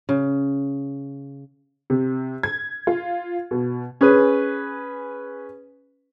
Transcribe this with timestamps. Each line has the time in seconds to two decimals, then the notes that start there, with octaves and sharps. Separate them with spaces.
0.09 C#3
1.90 C3
2.43 G#6
2.87 F4
3.51 B2
4.01 C#4 G#4 B4